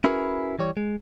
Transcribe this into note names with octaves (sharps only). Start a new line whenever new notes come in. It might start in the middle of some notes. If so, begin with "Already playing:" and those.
C#4 E4 F#4 G#4 A#4 B4
E3 G3 C#5
G#3